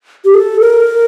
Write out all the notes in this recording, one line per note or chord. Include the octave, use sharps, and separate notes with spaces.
G4
A4
A#4